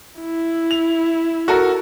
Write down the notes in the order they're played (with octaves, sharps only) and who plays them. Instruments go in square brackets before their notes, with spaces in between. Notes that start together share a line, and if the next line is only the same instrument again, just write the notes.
[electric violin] E4
[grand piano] F7
F#4 A4 A#4